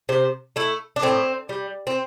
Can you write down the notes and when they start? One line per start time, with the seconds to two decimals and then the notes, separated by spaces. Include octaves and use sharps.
0.09 C3 C5
0.56 A3 E4
0.96 D4
1.02 A2 C4
1.49 G3
1.87 C4